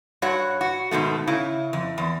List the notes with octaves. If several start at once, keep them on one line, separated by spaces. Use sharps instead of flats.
G2 F#4 C#5 F#5
F#4
G#2 B2 D#3 A3
C#3 E4
F2
E2